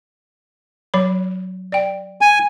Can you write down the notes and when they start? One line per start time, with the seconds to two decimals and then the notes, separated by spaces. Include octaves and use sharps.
0.94 F#3 C#5 B5
1.72 D5 G5
2.21 G#5